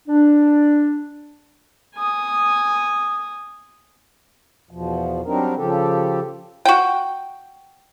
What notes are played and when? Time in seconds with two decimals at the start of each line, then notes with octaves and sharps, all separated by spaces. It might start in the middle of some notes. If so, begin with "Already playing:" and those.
0.08 D4
1.96 G#5 D#6
4.71 E2 B2 F3
5.26 F#3 G3 C4 D4 D#4 A#4
5.57 C#3 F3 G4 A4
6.65 F#4 G5